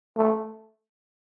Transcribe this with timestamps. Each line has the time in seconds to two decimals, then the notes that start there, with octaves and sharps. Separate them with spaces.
0.17 A3